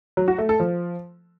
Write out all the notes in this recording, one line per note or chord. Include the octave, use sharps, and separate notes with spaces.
F#3
F#4
A3
A4
F3